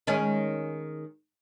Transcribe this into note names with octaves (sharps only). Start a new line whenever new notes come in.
D#3 G#3 C#4